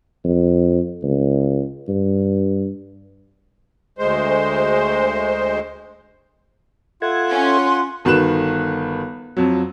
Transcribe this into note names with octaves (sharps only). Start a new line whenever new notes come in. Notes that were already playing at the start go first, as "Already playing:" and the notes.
F2
C#2
G2
D2 G#3 C5
F4 A4 E5 F#5 G#6
C#4 C6
G1 D#3 F#4 B4 F#6 E7
F2 F#3